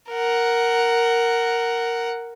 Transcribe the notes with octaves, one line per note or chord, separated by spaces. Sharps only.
A#4 F#5